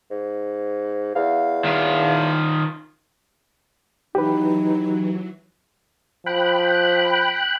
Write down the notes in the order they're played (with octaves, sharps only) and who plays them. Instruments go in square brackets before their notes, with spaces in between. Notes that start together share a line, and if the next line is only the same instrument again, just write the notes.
[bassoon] G#2
[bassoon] E2 [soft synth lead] F5
[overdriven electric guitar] D#3 F4
[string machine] E3 F#3 [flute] D#4 [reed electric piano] G4 B4
[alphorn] F3 [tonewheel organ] G5 B5 F#6